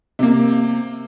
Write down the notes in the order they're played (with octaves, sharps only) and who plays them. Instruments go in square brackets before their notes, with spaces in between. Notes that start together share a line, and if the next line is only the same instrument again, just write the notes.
[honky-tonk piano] C3 A#3